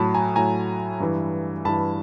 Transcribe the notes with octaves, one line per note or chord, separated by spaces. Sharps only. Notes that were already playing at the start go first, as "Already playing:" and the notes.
Already playing: A2 F#3 A5 B5
G#5 A#5
A2 F#3 G#5 A#5
G2 E3
G2 E3 A5 B5